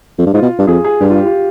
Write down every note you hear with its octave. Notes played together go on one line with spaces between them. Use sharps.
F2
G2
G#2 F4
B2
G2
F2 G#4
G#4
G2 G4
F4
G4
F4